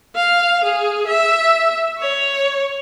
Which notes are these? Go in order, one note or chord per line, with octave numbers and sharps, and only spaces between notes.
F5
G#4
E5
C#5